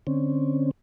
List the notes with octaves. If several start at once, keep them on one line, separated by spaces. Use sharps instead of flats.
D3 C4 C#4